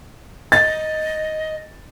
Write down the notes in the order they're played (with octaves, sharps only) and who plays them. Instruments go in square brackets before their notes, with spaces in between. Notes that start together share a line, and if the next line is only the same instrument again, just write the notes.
[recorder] D#5 [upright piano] A6